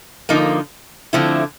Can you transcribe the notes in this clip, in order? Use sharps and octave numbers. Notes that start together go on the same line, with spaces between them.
D3 F3 A#3 D#4
D3 F3 A3 C4 E4